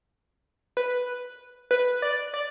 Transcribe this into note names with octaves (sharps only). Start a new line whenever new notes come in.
B4
B4
D5
D5